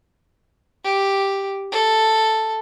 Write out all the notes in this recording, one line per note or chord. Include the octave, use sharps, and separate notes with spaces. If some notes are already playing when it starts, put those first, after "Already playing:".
G4
A4